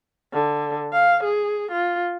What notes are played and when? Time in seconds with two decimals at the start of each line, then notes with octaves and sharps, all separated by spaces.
0.33 D3
0.93 F5
1.24 G#4
1.71 F4